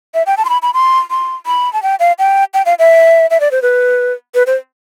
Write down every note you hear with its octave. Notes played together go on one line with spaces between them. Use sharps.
E5
G5
A5
C6
B5
B5
C6
C6
B5
A5
G5
F5
G5
G5
F5
E5
E5
D5
C5
B4
B4
C5